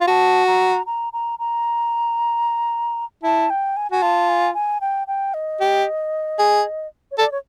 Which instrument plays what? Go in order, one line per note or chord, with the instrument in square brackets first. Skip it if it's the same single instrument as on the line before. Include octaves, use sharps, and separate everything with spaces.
[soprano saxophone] F4
[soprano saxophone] F#4 [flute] A5
[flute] A#5
A#5
A#5
A#5
[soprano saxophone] E4 [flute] A5
[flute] G5
G#5
[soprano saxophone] F#4 [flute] G#5
[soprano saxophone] F4 [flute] A5
[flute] G#5
G#5
G5
G5
D#5
[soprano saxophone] G4
G#4
[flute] C#5
[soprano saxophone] A4 [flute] D5
[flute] C#5